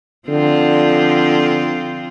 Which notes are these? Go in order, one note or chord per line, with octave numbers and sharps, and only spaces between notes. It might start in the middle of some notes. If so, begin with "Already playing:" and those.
D3 F3 C4 F4